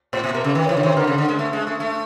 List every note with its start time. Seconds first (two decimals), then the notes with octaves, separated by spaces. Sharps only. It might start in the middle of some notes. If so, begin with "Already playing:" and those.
0.13 A2 C5
0.24 A#2
0.34 B2 A#4
0.44 C#3
0.54 D#3 B4
0.66 C#5
0.69 E3
0.76 D3 C#5
0.83 D#3 C5
0.92 B4
0.97 D3 A#4
1.07 C#3
1.18 D3
1.29 G#3
1.39 A3
1.53 G#3
1.67 A3
1.80 A3